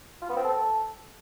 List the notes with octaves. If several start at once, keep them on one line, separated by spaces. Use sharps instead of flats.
F4
B3
C4
A4